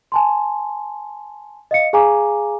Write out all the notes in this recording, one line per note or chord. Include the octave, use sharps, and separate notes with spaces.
G#5 A5 C6
D#5 F5 C#7
G#4 F5 G#5 A#5 D6